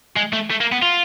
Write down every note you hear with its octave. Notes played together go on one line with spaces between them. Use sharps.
G#3
A3
A3
A#3
B3
F4